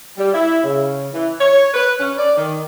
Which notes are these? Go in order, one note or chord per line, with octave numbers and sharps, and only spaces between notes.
G3
E4
C#3
E3
C#5
B4
C#4
D5
D#3